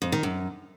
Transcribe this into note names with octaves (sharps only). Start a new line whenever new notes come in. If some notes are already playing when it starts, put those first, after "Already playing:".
F2
D#3
F#2